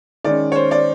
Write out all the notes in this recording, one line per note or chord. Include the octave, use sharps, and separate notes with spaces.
D#3 G#3 C#4 D5
C#5
C5
D5